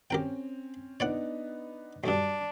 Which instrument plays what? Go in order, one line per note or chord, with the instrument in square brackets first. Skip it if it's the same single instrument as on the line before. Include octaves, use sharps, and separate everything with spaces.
[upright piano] C4 C#4 [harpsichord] G4 A#4 G5
[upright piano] B3 D4 D#4 [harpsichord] C#5 D5 F#5
[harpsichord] B1 G2 [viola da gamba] D4